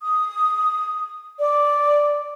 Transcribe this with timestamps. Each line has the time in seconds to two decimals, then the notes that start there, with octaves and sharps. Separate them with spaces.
0.02 D#6
1.39 D5